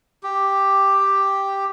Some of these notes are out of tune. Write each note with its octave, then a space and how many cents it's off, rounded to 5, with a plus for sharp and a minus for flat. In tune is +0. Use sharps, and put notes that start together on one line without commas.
G4 +0